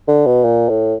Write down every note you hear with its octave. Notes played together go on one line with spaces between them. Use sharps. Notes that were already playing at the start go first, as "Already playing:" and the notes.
D3
B2
A#2
A2